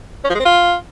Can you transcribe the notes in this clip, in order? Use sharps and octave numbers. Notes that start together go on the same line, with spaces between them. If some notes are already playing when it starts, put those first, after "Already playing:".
C#4
F3
G#3
C4
F4